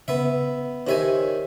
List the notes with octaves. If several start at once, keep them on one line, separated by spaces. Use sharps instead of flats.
C#3 B3 E5
D#3 G4 C5 C#5 E5 G#5